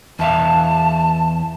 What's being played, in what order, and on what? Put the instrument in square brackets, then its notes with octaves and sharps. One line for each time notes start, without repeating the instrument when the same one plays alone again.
[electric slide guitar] E2 E5 F5 [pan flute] A5